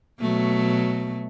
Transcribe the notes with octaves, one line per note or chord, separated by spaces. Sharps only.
B2 F#3 A3